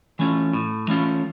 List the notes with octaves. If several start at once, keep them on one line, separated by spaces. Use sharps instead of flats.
E3 A3 C#4 F4
A2
E3 A3 C#4 F4